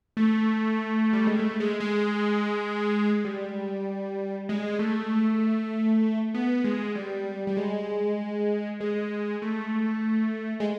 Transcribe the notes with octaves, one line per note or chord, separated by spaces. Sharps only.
A3
G3
G#3
A3
G#3
G#3
G3
G#3
A3
B3
G#3
G3
G3
G#3
G#3
A3
G#3